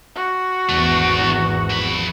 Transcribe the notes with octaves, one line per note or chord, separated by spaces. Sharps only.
F#4
G#1 E2 A3 D4
F3 B5